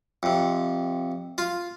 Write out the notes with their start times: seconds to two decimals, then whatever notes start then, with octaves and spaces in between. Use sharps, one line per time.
0.23 F2 C3
1.38 F4 F5